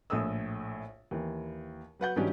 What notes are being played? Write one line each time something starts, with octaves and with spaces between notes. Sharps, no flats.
A#1 A2 A4 D#6 E6
D#2 E3
F#3 B4 F#5 G6
G#2 E3 F#3 C#4 D4 G4